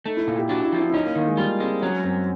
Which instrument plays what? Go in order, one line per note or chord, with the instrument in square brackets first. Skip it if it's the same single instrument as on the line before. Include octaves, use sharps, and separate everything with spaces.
[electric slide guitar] A3 [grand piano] D#4
[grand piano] E4
[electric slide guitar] A#2 [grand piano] F4
[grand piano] G4
[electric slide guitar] D4 [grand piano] F#4
[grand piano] E4
[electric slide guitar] F3
[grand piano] E4
E4
[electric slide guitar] C#4 [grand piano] D#4
[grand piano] A#3
[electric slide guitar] D#3 [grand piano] A#3
[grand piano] G#3
[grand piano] G3 [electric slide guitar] F4
[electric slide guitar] G#3 [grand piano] C4
[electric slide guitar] F#3 [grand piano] C#4
[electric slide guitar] F#2 [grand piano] C4